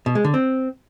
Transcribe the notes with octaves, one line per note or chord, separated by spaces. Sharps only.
B2
G#3
D3
C4